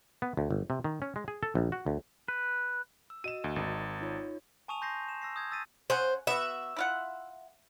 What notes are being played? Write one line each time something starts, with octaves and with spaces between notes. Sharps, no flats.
B3
D2
G1
C3
D#3
C#4
G#3
G#4
A4
A#1
F#4
D2
B4
E6
F#4 D#5 D#7 E7
D2
G#1
D#4 F4 C#5
G#5 A5 C#6 D#6 D#7 F7
C6 G6 A#6 C7
E7
E6 A#6 C7
D#6 G6 G#6
D#6 E6 A6 B6 D#7
C#3 G#4 C5 F#5
B3 F#4 E5
E4 F4 F#5